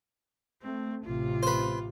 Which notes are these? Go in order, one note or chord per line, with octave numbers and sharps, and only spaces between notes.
A3 C4
A1 C3 F4
B4 C5